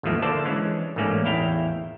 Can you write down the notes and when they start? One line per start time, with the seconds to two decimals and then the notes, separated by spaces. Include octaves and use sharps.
0.03 G#1 D#2 E3 F3 A3 A#3
0.22 D3 A#3 C5 D5 A5
0.45 E3 G#3 C#4 D4
0.96 A1 G#2 A3 A#3 C#4 D5
1.25 A1 E2 E4 F5 G5 A#5